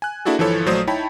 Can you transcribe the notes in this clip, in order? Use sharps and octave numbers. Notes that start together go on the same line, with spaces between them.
G#5 F#6
A#3 D4 E4 F#4 G#4 A4
G1 E3 F3 E4 A4 C#5
A#1 F#3 A3 C5 D5 D#6
D#4 E4 C#5 G5 A5 B5